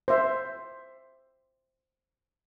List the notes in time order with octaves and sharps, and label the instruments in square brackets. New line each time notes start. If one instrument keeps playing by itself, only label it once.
[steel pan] C5 E5